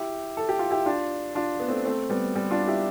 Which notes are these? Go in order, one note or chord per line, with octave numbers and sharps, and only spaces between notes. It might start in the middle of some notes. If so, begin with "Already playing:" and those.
Already playing: E4 G4
A4
G4
F4
E4 G4
D4 F4
D4 F4
B3
A3 C4
A3 C4
G3 B3
G3 B3
D4 F4
E4 G4